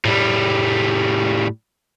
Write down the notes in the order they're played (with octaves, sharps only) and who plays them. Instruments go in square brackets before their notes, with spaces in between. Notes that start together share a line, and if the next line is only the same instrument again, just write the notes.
[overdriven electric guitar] A2 G3